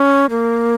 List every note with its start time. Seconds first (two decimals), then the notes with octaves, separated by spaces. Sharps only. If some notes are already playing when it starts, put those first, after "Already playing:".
Already playing: C#4
0.30 A#3